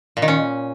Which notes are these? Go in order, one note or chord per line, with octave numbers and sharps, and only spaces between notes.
A#2
D#3
C#4